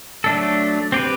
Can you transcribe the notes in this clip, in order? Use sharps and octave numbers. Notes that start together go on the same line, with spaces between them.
F#3 A3 D4 A4
C4 G4 B4